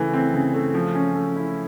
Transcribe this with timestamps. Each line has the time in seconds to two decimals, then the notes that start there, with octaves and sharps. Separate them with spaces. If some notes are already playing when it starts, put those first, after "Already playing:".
Already playing: C#3 E3 A3
0.14 C4
0.34 C#3
0.54 A3
0.75 F3
0.95 C#4
1.15 A3
1.36 E4